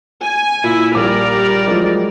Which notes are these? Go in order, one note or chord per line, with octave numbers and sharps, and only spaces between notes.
G#5
A#2 E4
A#1 G3 A#4 D5 D6
F3 F#3 G#3